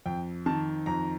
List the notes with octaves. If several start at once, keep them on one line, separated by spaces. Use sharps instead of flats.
F2 G5
D#3 A5
F2 A#5